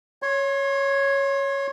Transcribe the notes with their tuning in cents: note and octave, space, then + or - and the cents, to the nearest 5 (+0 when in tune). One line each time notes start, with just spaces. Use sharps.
C#5 +0 C6 +40